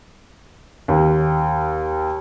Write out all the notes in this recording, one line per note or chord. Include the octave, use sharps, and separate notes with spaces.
D#2